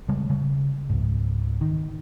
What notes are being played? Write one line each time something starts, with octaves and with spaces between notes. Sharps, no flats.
C#3 G3 G#3
C#3 G3
C#2 G#2
D#3